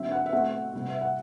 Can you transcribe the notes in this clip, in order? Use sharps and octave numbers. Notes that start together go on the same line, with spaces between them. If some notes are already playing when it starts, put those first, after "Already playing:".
Already playing: D3 F#3 C4 E5
F#5
E5
B2 A3 C4 F#5
C3 G3 C4
E5
F#5